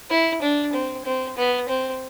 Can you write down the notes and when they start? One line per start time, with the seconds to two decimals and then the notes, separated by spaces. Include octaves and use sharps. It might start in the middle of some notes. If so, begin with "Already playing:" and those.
0.10 E4
0.42 D4
0.73 C4
1.05 C4
1.37 B3
1.69 C4